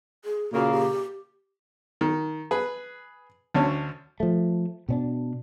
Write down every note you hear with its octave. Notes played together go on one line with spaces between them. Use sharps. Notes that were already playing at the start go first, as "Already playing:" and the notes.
G#4
A#2 C#3 A#3 F#4
G4
D#3
G#4 B4
D2 D3 C#4
F3 A3
B2 C#4 D4